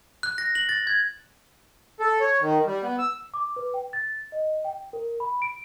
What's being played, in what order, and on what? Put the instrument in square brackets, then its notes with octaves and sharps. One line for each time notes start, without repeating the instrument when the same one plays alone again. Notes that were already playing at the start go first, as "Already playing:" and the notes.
[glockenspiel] F#6
A#6
F#7
A6
G#6
[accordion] A4
C#5
D#3
G3
B3
E6
[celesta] D6
B4
G5
A6
D#5
G5
A#4
B5
D7